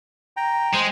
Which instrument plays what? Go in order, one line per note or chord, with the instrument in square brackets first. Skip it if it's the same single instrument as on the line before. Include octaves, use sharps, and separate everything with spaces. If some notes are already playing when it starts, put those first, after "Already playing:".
[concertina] G5 A#5
[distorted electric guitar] G#3 [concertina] C5